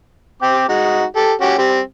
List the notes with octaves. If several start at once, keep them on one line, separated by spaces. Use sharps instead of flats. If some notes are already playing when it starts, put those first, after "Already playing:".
C4 G5 D6
G#3 D#4 F#4
G4 A4
C#4 F#4 G4
G3 C4 G4